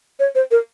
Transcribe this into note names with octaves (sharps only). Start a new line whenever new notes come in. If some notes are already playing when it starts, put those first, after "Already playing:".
C#5
C5
A#4